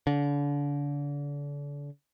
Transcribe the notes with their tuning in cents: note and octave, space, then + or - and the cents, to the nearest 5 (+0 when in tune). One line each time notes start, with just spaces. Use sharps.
D3 -35